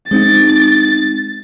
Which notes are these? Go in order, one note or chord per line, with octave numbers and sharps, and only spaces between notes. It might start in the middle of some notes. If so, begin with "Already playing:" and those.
G#3 C4 D#4 A6